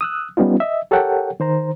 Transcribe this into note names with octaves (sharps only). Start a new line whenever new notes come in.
D#6 E6 F#6
G3 B3 C#4 D#4 F4
D#5 E5
G4 A4 A#4 C#5 F#5 G5
D#3 C5 A#5